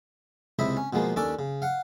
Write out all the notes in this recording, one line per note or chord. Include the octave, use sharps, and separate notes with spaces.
C#2 C3 E4 D#5 B5
C#4
B2 F3 G#3 A#3
D#2 C#4 D4 A4 D6
C#3
F5 F#5